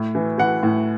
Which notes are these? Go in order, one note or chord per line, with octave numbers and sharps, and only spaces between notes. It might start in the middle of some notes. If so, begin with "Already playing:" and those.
Already playing: A2
E3
E3 F#5
A2